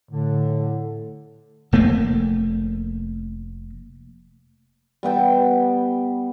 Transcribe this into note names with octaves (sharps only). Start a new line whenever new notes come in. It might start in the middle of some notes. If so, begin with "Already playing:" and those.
A2 D3
F1 A3 A#3
G3 B3 G5 A5